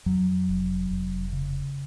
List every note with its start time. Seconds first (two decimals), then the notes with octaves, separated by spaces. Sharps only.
0.06 F2 F#3
0.49 F1
0.91 F1
1.33 C#3